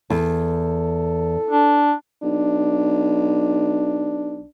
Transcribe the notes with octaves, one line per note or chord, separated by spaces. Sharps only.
E2 A4
D4
B1 D4